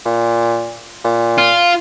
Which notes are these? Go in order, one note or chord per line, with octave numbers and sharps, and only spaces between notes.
A#2
A#2
F4